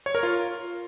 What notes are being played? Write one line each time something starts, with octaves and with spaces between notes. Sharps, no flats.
C#5
A#4
F4